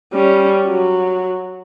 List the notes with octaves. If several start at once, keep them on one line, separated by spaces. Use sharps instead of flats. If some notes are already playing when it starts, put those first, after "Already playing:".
G3 C#4
F#3